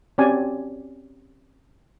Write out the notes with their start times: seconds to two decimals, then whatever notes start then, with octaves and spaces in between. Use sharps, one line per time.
0.18 C4 C#4 F#4 G4 D5 G#5